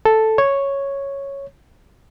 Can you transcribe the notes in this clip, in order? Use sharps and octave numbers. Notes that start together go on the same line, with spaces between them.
A4
C#5